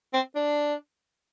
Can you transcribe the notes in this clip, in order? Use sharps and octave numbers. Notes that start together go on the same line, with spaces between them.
C4
D4